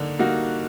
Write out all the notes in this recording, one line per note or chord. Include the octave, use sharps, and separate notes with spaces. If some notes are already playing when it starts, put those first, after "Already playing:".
Already playing: D3 A#3 D#4
G3 A#3 D#4 F#4